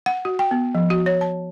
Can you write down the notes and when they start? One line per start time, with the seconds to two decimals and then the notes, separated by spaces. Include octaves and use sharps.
0.06 F#5
0.25 F#4
0.39 G5
0.51 B3
0.75 F3
0.90 F#4
1.06 C#5
1.21 A5